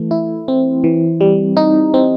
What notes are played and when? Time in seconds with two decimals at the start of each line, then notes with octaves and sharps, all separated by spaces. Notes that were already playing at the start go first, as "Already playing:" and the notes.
Already playing: E3 A3
0.11 E4
0.48 C4
0.84 E3
1.21 G3
1.57 D#4
1.94 C4